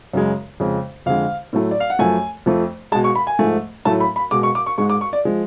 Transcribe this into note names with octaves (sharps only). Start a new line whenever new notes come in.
F#2 C#3 G#3
F2 C#3 G#3
F2 D3 G#3 F5
A2 F#3 A3
D5
F5
F#5
F#2 F3 A3 G#5
F2 F3 A3
B2 G#3 A5
C#6
B5
G#5
G#2 F3 A3
A2 F#3 A3 A5
B5
B5
B2 G#3 D6
C#6
D6
C#6
G#2 G#3 C#6
D6
C#6
D5
F3 G#3